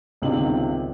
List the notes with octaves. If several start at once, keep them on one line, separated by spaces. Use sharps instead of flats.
G1 C#2 C3 D#3 D4 F#7